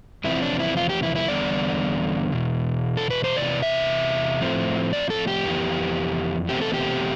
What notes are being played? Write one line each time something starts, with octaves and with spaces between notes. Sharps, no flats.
E2 C3 F3 C4 E4
D4
E4
F4
G4
E4
E4
E2 D3 G3 B3 D5
E2 B2
A4
B4
C5
E2 C3 E3 B3 D5
E5
A2 F3 A3 C4
D5
A4
G4
F2 E3 B3
E2 B2 A3 C4 G4
A4
G4